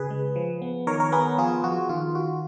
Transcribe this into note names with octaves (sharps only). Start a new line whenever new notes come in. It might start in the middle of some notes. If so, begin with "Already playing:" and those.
Already playing: C#3 G#4 B4
G#3
F3
B3
D#3 A#4 C#5
A#4 C#5
B3 G#4 B4
F3 F4 G#4
F3 F#4
D#3 F4
D#3 F#4